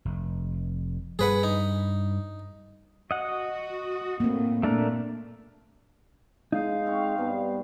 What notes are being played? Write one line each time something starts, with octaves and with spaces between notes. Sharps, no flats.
F1
G2 G3 G#4 B4 F#5
D#4
F#4 D#5 F#5
A2 A#3 C4
A#2 A3 D4 A#4
G#3 D#4 F5
C4 C#6
G2 B3 A5